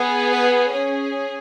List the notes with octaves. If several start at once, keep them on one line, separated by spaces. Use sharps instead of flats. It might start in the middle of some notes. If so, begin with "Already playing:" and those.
Already playing: B3 G#4
B4
C#4 G#4 C#5